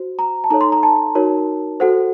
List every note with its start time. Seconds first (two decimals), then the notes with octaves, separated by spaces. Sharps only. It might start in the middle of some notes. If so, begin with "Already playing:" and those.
Already playing: F#4 C5
0.19 A#5
0.44 A5
0.50 D#4 A4 C#5 A#5
0.61 C6
0.72 A#5
0.83 A5
1.15 D#4 F#4 A#4 C#5
1.80 F#4 A4 C5 F#5